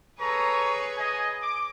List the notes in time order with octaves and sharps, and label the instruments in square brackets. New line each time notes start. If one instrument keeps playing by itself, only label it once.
[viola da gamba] G#4 B4 C#5 [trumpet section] A4 A#5 C#6
[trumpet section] D#5 G#5
D6